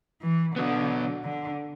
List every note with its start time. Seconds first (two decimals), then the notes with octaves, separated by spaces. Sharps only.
0.22 E3
0.56 B2 D3 F#3 B3
1.24 D3